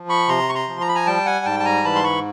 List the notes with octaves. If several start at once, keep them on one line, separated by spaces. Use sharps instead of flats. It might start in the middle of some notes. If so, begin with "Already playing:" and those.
Already playing: F3
B5 C#6
C3 A#5 C6
C#6
A#5 C6
F3
A#5
B5
G#5 A#5
G3 G5 A5
F#5 G#5
G#2 G5 A5
A5
G#5 A#5
E3 A5 B5
C6
B5 C#6